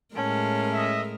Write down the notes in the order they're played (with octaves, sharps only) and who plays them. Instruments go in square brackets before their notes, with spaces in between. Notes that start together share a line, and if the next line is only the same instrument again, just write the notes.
[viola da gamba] A2 G#3 A#4 [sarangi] C#4 [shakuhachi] A5
[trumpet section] D#5 E5